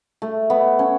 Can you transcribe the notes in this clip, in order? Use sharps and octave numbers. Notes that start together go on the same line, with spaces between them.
A3
B3
C#4